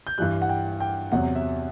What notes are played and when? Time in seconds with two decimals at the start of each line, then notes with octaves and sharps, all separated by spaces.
0.07 G6
0.18 G2 E3 G3 F#6
0.42 F#5
0.49 G5
0.80 G5
1.12 E2 C3 F#3 F#5
1.35 E5